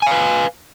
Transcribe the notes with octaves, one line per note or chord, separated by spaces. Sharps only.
B4 F5 G#5